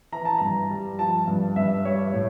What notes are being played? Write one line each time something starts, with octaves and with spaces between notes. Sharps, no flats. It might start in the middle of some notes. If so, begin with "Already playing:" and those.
E3 A#5
A5
G2 A#5
G3
F3 A5
G2
G2 E5
G3 C#5
A2